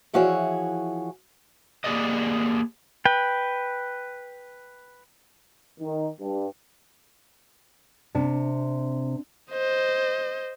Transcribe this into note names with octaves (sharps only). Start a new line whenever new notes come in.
E3 F3 E4 F#4 G#4 C#5
A#3 G4 G#4 D5 D#5
B4 G5
D#3
G2
C3 C4 D4
C5 D#5